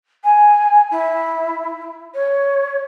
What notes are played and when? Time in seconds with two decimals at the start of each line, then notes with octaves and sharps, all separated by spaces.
0.24 G#5
0.91 E4
2.14 C#5